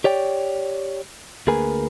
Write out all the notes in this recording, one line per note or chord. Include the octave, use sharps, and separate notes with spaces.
G4 C#5 D5 G5
D2 A#3 G#4 A#4 B4 G#5